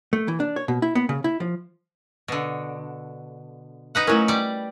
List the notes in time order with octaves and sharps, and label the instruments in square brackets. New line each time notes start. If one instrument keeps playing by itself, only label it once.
[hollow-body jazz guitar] A3
E3
D4
C#5
B2
E4
B3
C#3
E4
F3
[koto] B2 D3
D#4 B4 F#5
[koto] F#3 C#4 [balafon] A3 E4 A#4
[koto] G3 D5